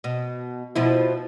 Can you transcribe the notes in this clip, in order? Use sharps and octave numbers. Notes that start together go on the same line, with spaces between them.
B2
B2 F3 E4